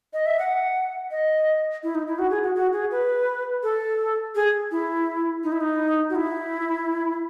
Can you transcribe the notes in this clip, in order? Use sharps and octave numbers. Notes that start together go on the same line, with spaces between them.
D#5
E5
F#5
D#5
E4
D#4
E4
F#4
G#4
F#4
F#4
G#4
B4
A4
G#4
E4
D#4
E4
D#4
F#4
E4